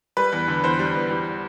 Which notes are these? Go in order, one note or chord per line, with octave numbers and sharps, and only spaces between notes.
G3 B4
E2
D3
E2 C5
G3
E2
G3